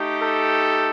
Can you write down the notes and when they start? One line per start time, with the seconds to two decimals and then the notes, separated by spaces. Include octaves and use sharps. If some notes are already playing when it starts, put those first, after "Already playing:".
Already playing: A3 D#4 G4
0.21 A4